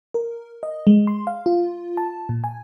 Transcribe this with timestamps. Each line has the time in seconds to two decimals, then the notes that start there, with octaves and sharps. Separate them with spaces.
0.14 A#4
0.63 D#5
0.87 G#3
1.07 C6
1.27 F5
1.46 F4
1.97 A5
2.29 A#2
2.44 G#5